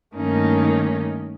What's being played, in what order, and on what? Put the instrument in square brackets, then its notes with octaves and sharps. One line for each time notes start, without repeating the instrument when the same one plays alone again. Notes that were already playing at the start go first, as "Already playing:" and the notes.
[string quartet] G2 D#3 A3 A#3 C#4 D#4